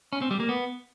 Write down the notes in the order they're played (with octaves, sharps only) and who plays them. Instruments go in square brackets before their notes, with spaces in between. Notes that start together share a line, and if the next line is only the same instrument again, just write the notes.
[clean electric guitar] C#4
C4
G3
A#3
B3